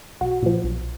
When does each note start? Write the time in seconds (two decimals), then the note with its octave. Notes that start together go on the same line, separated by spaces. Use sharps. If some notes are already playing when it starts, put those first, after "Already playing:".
0.21 B1 F#4
0.42 A#2 F3
0.64 B1